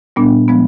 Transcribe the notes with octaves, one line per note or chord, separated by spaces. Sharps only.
A#2 G3 B3 D4
F3 G#3 B3